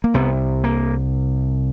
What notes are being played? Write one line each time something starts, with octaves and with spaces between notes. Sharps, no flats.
A#3
C2 C3 B3
A#3